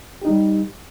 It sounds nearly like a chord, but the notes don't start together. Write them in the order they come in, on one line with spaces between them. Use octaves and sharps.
G4 D#4 G3